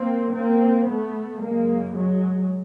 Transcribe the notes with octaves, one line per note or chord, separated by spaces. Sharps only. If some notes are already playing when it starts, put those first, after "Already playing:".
Already playing: A#3 C4
A#3 C4
A3 B3
F#2 C#3 G#3 A#3
F#3 G#3